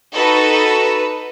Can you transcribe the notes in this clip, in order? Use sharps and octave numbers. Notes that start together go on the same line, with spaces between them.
D#4 F#4 A4 B4